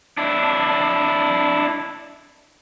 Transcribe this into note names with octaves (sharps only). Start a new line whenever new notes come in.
D4 E4